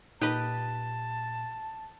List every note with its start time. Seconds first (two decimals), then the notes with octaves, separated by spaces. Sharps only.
0.21 A#2 D#4 G4 B4 D#5 A5